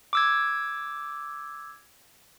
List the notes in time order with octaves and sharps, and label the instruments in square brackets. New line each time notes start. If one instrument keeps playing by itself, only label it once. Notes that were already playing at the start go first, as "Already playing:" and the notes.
[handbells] D6 E6 G#6